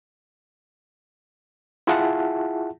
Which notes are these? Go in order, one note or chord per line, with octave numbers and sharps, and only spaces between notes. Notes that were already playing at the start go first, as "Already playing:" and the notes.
E4 F4 G#4 E5 F#5 A5